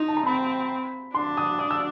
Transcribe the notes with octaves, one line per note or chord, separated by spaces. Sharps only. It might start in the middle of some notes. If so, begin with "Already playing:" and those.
Already playing: D#4 C6
A5
A#5
C4 B5
D4 C6
D#6
D#6
E6